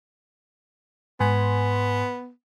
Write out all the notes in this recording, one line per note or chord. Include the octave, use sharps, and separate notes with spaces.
G#2 B3 G#5 C6